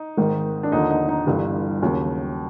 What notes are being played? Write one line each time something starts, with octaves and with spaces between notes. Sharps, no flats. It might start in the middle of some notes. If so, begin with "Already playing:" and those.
Already playing: D#4
G#1 G#2 D#3
D4
D#2 D3 F3 D#4
D#4
D#4
G1 G2 E3 G3
D#2 C#3 F#3